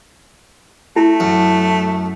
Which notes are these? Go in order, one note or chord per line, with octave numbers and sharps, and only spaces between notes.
A3 E4
F#2